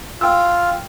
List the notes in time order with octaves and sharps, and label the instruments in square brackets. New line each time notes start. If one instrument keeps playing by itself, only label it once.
[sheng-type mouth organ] F4 [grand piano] G5 E6